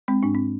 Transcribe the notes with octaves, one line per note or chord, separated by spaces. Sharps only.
G#3 C4
G#2 D4
C4